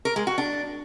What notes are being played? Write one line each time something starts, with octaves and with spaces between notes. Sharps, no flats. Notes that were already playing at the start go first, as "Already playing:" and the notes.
A#4
G#3
F#4
D4